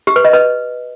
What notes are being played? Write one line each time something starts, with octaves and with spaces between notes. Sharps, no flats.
G4
B4
D#5
B4